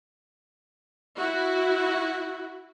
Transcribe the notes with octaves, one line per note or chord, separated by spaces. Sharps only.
E4 F#4